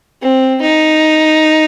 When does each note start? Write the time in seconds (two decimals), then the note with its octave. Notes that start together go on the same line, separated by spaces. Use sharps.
0.22 C4
0.61 D#4